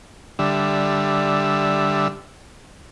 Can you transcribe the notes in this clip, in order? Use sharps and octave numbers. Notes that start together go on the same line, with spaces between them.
D3 G3 E5